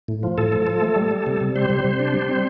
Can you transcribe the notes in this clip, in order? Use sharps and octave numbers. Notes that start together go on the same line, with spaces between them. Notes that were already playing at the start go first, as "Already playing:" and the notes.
A2
F3
A2 A4
F3
F3
A3
G3
G3
C3
C3
G3 C5
C3
C3
D4
G3
C4